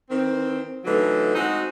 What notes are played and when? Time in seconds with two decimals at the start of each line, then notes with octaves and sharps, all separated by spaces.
0.10 D#3 E3 C4
0.85 D3 E3 F#3 A3 D#4
1.34 G#3 C4 D#4 F#4